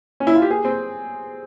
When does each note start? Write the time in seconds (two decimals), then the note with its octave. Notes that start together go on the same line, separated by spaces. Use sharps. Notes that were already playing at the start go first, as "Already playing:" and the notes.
0.20 C#4
0.27 E4
0.36 F4
0.42 G4
0.51 G#4
0.65 C4